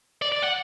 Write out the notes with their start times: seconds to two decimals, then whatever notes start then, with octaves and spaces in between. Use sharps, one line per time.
0.22 D5
0.32 D5
0.42 F#5